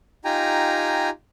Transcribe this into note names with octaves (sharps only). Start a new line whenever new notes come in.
D#4 F4 G4 G5 G#5 A#5